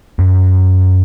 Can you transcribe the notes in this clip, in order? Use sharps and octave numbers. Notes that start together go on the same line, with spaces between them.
F#2 F#3